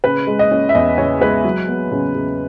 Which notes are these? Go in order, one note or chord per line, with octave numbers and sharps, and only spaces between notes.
C#3 B4
G#3
D#5
C#4
E5
E2 D#5
C#3 C#5
G#3 B4
F#3
B3
C#3
C#3